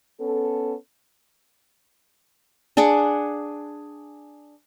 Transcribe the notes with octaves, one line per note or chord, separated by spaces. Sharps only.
B3 C#4 A4
D4 G#4 F#5 D6